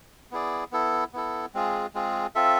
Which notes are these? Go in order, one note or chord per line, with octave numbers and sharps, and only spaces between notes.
B3 E4 G#4 D5
B3 E4 A4
B3 E4 A4
G#3 C4 F4 G#4
G#3 C4 F4 G#4
C4 F4 A4 E5